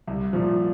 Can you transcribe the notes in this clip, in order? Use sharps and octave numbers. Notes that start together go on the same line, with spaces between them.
C2
A#2 F3